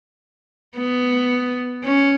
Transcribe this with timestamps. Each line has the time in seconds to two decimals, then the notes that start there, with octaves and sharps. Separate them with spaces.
0.77 B3
1.84 C#4